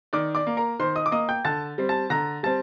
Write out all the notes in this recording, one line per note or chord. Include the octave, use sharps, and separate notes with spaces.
D#3 D5 D6
D5 D6
A#3
A#4 A#5
D#3 C5 C6
D#5 D#6
D6
A#3 D#5 D#6
G5 G6
D3 A5 A6
G3 C4
A5 A6
D3 A#5 A#6
G3 C4 A5 A6